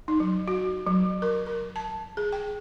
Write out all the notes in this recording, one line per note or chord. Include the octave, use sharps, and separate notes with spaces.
D#4
F#3
F#4
F#3
A#4
A#4
A5
G#4
G5